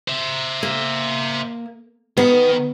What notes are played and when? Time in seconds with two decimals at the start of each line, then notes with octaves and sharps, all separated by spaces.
0.08 C5 E5
0.63 A#3
2.17 D#3 B3